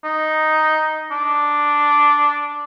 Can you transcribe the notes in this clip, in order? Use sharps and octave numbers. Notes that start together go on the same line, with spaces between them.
D#4
D4